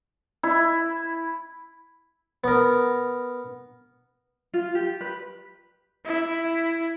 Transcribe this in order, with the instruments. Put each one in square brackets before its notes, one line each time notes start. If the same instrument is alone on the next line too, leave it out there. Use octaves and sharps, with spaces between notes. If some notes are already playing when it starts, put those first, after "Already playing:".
[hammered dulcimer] E4
[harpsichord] B3 A#4
[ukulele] F4
G4
B4
[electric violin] E4